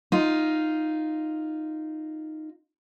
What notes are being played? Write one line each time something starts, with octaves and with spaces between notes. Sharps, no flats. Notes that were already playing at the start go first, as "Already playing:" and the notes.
D#4 F4